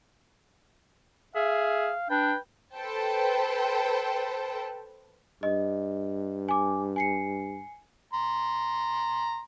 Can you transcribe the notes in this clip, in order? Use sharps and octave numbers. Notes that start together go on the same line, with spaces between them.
G#4 E5 F5
D4 B4 G5
A4 B4 C5 G5 A5
G2 D#5
G#5 D6
G#5 C7 C#7
A#5 C6